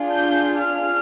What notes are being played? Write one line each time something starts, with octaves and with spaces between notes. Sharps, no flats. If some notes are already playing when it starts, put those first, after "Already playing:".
Already playing: D4 F4 G#4
G6
F6